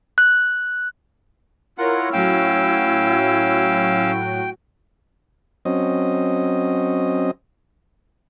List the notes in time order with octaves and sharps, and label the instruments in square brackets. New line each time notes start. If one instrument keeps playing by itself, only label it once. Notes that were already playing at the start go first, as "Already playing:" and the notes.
[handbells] F#6
[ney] E4 [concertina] F4 F#5 [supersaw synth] A#4 C#5
[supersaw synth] A2 F#3 F#4 [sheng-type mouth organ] C#4 F5 E6 [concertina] G5
[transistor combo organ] F#3 C4 C#4 D#5